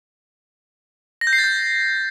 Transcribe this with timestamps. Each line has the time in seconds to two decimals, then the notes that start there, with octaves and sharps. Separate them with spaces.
1.21 A#6
1.27 G6
1.33 C7
1.38 A6
1.44 G6